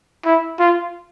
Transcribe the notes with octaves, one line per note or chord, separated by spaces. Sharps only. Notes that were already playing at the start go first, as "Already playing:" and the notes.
E4
F4